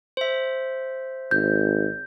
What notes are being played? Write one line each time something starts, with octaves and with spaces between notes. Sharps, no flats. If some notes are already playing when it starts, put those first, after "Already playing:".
C5 E5
G#1 G6